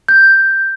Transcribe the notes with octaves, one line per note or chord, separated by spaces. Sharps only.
G6